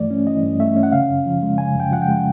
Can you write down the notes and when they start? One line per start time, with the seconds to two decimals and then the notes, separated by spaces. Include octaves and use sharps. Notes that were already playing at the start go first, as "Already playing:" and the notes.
Already playing: G2 E3 A3 D5
0.11 C#4
0.26 E3 D#5
0.43 G2
0.60 A3 E5
0.76 C#4
0.83 F#5
0.92 C#3 F5
1.09 F#2
1.26 F3
1.42 G#3
1.58 C#3 G#5
1.75 F#2
1.80 G5
1.91 F3 F#5
2.02 G5
2.08 G#3